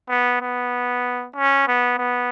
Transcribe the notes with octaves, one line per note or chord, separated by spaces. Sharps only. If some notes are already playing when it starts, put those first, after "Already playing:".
B3
B3
C#4
B3
B3